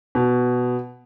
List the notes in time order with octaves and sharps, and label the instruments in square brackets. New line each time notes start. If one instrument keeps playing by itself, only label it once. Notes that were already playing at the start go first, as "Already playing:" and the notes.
[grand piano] B2